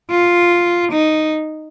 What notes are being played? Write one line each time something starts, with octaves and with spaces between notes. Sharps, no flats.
F4
D#4